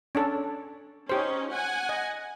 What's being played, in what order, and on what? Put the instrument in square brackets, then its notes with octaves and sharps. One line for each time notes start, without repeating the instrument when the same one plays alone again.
[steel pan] C#4 D4 A4
[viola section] C#4 D#4 [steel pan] G4 C5
[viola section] F#5 G#5
[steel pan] D#5